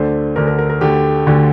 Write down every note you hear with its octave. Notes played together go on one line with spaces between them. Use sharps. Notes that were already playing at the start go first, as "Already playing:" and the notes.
Already playing: D2 D3 A3 D4 C5
D2 D3 A3 D4 A#4
A#4
A#4
A#4
D2 D3 A3 G4
D2 D3 A3